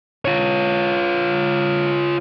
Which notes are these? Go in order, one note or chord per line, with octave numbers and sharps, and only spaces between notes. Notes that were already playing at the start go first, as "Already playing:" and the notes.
F4 C#5